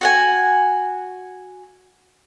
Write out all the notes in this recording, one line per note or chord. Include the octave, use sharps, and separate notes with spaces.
F#4 F#5 G#5